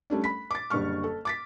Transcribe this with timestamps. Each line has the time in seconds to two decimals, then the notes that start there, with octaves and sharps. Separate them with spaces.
0.10 G3 A3 C#4 D4
0.24 B5 B6
0.51 D6 A6
0.70 F#1 D3 G3 C#6 F6
1.04 A4
1.25 D6 A6 B6